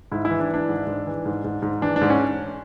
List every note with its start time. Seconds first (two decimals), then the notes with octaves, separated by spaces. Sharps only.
0.12 G#2 E4
0.25 E4
0.30 E3
0.39 D4
0.49 E3
0.54 D4
0.69 G#2
0.87 G#2
1.07 E3
1.25 G#2
1.44 G#2
1.62 G#2
1.82 E3 D4
1.96 D4
2.01 G#2
2.10 C#4